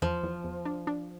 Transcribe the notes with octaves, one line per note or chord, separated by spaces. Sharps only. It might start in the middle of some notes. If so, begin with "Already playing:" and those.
E2 F3
E2
E2
D4
D4